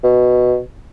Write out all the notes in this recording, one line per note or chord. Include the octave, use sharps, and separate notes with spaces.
B2